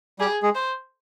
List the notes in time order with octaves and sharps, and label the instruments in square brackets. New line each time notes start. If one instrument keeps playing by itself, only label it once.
[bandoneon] G3 G4 [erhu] G#4
[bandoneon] G#3 G#4
[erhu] C5